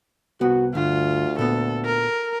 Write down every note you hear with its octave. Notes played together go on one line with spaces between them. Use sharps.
C2 B3 F#4
D2 G2 D3 F4
A#2 B3 A4
A#4